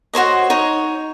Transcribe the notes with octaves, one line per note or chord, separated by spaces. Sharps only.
F#4 C5 C#5 D#5
D#4 C#5